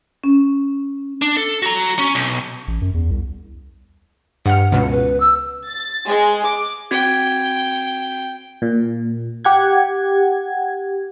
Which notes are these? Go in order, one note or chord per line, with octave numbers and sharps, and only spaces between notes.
C#4
D4
A4
F#4 A#5
C#4
B1
A1
F#2
E2
C2
G2 F#5 F6
C#2 B2
B4
E6
A6
G#3
D6
C4 F#4 G5 G#6
A#2
G4 F#5 G#6